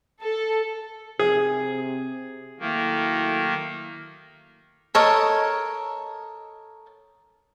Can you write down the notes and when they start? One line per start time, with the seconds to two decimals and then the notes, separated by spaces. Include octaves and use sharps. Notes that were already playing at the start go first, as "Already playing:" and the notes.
0.20 A4
1.19 C3 G#4
2.60 D#3 F#3 A3 A#3 E4
4.95 A4 A#4 C#5 D#5